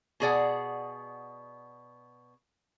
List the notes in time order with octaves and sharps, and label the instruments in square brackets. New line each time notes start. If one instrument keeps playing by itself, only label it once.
[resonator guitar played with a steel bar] B2 G#4 D5 F#5